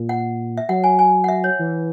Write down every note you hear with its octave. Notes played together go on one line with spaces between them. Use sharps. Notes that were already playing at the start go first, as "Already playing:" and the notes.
Already playing: A#2
F#5
E5
F#3 F#5
G#5
G#5
F#5
E5
C#5
E3